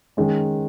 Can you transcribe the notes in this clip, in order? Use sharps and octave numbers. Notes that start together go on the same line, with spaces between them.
D#3 G#3 C#4